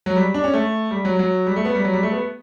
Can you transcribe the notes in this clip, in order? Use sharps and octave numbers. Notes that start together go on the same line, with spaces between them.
F#3
G3
D4
C#4
A3
G3
F#3
F#3
G3
A3
B3
G3
F#3
G3
A3
B3